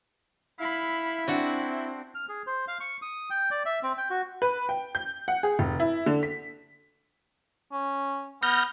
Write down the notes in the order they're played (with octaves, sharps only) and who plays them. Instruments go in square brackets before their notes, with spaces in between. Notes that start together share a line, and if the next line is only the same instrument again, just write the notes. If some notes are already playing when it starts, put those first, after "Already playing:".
[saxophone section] E4 [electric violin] F5 B5
[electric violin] C4 [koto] D4 F#4 F#5
[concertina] F6
G#4
C5
F5
C#6
D#6
G5
D5
E5
C4
G5
F#4
[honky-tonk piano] B4
G5
G6
F#5
G#4
F1
E4
D3
B6
[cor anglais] C#4
[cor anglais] B3 [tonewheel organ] F6 G6 A#6